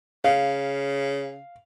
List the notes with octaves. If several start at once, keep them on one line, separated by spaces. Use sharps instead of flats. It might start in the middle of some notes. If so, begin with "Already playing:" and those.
C#3 F5